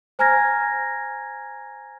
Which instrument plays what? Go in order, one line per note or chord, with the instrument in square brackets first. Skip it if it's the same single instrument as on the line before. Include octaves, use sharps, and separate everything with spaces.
[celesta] C5 G#5 A#5 F6 G#6 A#6